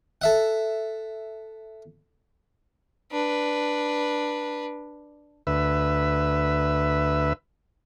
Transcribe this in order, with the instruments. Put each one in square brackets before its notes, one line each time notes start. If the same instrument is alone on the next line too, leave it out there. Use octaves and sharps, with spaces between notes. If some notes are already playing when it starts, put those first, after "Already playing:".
[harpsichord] A4 E5 F#5
[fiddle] D4 B4
[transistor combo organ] D2 B4 E5